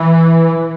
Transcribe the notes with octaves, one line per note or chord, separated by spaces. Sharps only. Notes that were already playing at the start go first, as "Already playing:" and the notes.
Already playing: E3